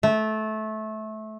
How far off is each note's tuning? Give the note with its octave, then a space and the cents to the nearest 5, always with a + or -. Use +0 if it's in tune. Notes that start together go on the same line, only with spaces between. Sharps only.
A3 -20